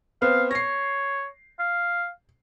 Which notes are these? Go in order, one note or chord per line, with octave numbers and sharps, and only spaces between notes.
B3 C4 F5
C#5 A#6 C7
F5